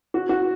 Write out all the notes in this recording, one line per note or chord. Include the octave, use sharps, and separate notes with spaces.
F#4
F#4